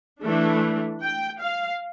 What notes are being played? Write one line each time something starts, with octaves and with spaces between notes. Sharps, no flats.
E3 A3 D4 A4
G5
F5